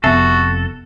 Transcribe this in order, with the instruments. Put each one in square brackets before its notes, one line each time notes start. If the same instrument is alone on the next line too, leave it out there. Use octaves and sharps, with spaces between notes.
[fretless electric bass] F1 F2 C3 [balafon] B3 E5 [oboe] F#4 [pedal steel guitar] A4